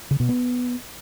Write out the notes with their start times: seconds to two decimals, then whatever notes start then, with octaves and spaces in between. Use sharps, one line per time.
0.11 C#3
0.20 B2
0.29 B3